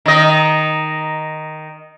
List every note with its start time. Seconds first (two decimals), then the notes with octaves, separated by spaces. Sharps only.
0.06 D#3 D#5